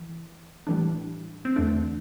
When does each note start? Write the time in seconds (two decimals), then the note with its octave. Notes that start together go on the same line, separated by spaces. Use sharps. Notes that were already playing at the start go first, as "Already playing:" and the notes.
Already playing: E3
0.67 A2 E3 G3 D4
1.45 C4
1.56 E2 D3 A3 D4